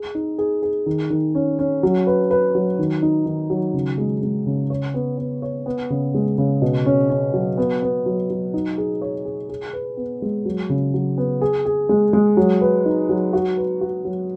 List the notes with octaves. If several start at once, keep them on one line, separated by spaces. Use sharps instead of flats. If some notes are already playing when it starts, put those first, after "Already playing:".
Already playing: G#4
D#4
G#4
G#4
D#3
D#3
C#4
C#4
F#3
B4
B4
F#3
D#3
D#4
D#3
F#3
C#3
G#3
G#3
C#3
C#5
B3
B3
C#5
B3
C#3
G#3
C#3
B2
C#4
C#4
F#3
B3
B3
F#3
F#3
D#4
G#4
C#5
G#4
G#4
B4
B3
G#3
F#3
C#3
F#3
B3
G#4
G#4
G#3
G#3
F#3
B4
D#4
F#3
F#4
B4
F#4
F#3